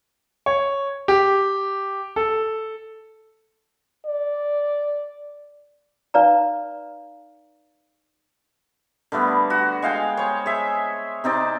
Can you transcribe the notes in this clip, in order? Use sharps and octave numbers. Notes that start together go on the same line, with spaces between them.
C#5
G4
A4
D5
D#4 B4 D5 F5 A#5
D3 G3 A3 B3
F#4
G#3 F5 G5 G#5
C5 C#5
G#4 E5
C3 C4 D#4 D5